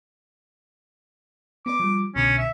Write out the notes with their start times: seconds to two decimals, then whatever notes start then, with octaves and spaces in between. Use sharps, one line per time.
1.66 B3 B4 D5 D6
1.80 F3 G3
2.15 C2 B2 D3 C#4
2.38 E5